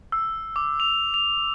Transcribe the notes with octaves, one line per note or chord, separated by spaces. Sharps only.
E6
D6
F7
F7